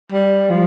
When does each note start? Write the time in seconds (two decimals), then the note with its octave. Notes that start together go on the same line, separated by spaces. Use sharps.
0.12 G3
0.50 F3